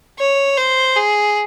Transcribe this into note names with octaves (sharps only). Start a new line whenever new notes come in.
C#5
C5
G#4